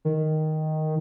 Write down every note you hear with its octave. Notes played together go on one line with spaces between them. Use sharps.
D#3